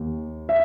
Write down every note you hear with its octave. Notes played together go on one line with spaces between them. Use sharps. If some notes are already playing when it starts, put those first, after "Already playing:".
Already playing: D#2
E5